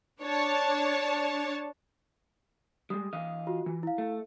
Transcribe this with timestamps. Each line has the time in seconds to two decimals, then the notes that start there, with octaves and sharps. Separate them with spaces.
0.22 D4 C#5 A5
2.90 G3 G#3 D#6
3.13 E3 D#5 F5
3.47 F4 F#4
3.66 E3
3.83 E4 F5
3.98 A3